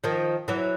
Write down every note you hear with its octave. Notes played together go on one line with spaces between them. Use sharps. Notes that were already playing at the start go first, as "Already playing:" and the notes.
D#3 F3
E3 F#3